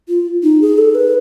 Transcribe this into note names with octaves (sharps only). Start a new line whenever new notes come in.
F4
D#4
G#4
A4
B4